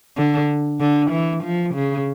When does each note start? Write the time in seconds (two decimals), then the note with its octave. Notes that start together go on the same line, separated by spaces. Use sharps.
0.17 D3
0.80 D3
1.11 E3
1.43 F3
1.74 C#3